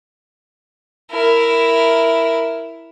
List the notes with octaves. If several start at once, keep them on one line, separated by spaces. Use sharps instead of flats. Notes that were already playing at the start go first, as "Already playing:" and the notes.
E4 A#4